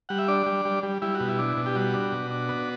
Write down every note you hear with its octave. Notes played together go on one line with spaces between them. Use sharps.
G3 F#5
E5
D4 D5
G3
G3
G3
G3 E4
F#4
B2
E4
D4
B2
G4
G3 F#4
D4
B2
D4
B3